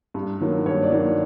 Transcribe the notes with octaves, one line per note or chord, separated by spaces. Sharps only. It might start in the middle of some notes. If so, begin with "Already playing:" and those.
G2
D#3 F#3 A#3
G2 C#5
D5
D#3 F#3 A#3